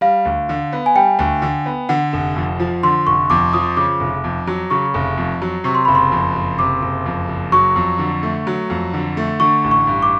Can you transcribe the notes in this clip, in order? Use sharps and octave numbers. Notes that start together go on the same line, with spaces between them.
G3 F5
D2
D3
B3
G#5
G3 G5
D2
D3
B3
D3 F#5
F1
F2
F3
D3 C6
F1 C#6
F2 D6
F3 D#6
C#3 D6
F1
F2
F#3
C#3 C#6
F1
F2
F#3
C3 C#6
C6
F#1 B5
C6
F2
F#1
C3 D6
F#1
F2
F#1
F#3 C#6
F2
D3
A3
F#3
F2
D3
A3
D3 C#6
A1
C#6
G2
D6